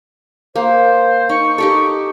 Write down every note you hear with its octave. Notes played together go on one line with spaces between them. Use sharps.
A#3 C5
D#4 C#6
D#4 G4 A4